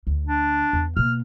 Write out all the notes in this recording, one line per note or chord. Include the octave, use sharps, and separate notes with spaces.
D2
D4
E2
B2 A#3 F6